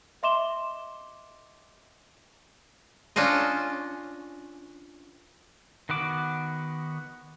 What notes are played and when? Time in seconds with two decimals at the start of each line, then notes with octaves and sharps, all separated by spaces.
0.23 D#5 E5 C6 D6 E7 G7
3.16 C#4 D4 F4 C5 D#5
5.89 D#3 B3 F#4 D6